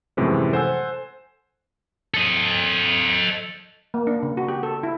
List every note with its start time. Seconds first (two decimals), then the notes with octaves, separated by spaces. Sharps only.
0.17 F#2 A2 C3 E3 F3 G#3
0.52 A4 C5 F#5 G#5 E6
2.14 A4 D#5
3.94 A#3
4.07 D4
4.23 C#3
4.37 F#4
4.48 G4
4.63 A4
4.83 E4